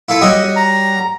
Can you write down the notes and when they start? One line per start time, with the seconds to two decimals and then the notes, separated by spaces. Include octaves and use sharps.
0.09 E4 F4 A4
0.21 G3 F#4 C#5 D#5 D#6
0.56 A#5